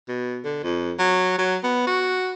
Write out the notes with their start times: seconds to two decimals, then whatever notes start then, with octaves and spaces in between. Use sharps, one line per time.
0.08 B2
0.44 D3
0.63 F2
0.99 F#3
1.38 F#3
1.63 B3
1.87 F#4